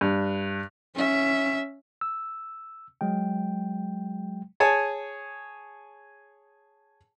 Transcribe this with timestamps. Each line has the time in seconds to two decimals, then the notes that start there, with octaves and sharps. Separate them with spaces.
0.01 G2
0.95 C#4 E5
2.01 E6
3.01 F#3 G#3 G5
4.60 G#4 C#5 G#5 A5